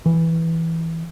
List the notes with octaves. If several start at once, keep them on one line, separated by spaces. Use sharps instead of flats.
E3